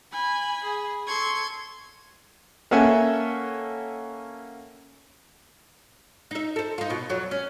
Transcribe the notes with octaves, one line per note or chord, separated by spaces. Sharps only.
G#5 B5
G#4
A4 C6 C#6 G#6
A#3 C#4 A4 E5 F#5 G#5
D#4 E5
A4 C5
D#4 F4
B2 B3
F2 F#3
C#4